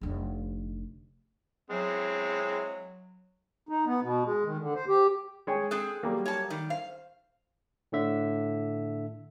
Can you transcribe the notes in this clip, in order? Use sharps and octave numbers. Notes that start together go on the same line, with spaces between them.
F1 D3
F#3 G#3 C4 E4
D#4
B3
B2
G#3
D#3
D3
C5
G4
G#3 C#5 G5
C4 G#4 A4 F#6
F#3 G3 A#3
C#5 A5
D#3 G3
C5 F5
A2 D3 E5